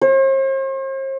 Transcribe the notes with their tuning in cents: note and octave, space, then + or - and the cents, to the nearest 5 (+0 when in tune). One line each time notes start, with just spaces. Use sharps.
C5 +45